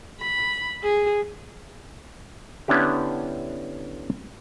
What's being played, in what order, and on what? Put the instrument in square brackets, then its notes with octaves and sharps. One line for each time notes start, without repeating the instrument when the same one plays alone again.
[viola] B5
G#4
[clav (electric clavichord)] D3 B3 C#4 D4 E4 G4